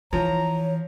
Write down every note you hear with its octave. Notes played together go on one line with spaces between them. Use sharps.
E3 F3 C#5 A#5